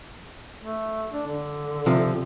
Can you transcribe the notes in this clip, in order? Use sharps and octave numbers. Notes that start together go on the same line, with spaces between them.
A3
D4
D3
C3 F3